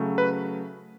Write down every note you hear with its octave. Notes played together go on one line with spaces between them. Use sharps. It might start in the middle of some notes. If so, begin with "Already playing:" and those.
Already playing: C#3 F#3 A3
B4